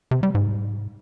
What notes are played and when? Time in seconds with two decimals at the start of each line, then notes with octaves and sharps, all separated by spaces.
0.11 C3
0.23 G3
0.35 G#2